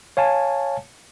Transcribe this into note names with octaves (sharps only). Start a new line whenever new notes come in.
C#5 F5 G#5 A5